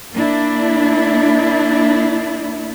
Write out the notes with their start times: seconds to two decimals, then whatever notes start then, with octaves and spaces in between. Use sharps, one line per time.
0.13 A#3 D4 E4